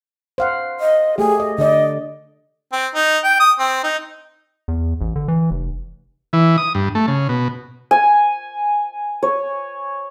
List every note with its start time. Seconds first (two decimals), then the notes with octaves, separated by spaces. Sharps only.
0.38 C5 F5 F#5
0.80 D#5
1.18 A3 G4 G#4
1.40 D#5
1.58 D3 D5 D#5
2.72 C4
2.95 D#4
3.24 G5
3.40 D#6
3.59 C4
3.84 D#4
4.68 E2
5.01 A1
5.16 D3
5.28 E3
5.51 F1
6.33 E3
6.58 D#6
6.75 G2
6.95 A3
7.08 C#3
7.29 B2
7.91 G#5
9.23 C#5